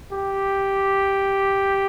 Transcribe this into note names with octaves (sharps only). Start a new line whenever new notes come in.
G4